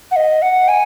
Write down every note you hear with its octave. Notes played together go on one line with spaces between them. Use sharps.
F#5
D#5
F#5
G#5